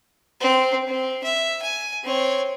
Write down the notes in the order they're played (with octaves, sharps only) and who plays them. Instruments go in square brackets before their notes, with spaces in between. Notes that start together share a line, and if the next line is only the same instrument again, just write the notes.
[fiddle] C4
C4
E5
G#5
C4 C#5